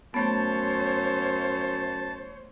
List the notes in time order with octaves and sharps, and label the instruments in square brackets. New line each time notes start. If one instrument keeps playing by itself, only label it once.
[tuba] F#2 [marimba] A3 B3 [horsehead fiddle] C5 C#5 [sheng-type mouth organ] A5